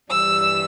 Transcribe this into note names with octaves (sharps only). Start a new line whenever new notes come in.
G2 E3 G3 E6